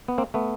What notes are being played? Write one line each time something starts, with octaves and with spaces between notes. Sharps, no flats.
B3
A#3 C4
A3 B3